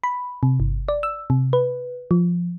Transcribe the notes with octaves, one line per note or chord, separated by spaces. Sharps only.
B5
C3
G1
D5
E6
C3
B4
F3